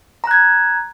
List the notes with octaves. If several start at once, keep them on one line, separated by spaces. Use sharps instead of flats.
A#5 F#6 G#6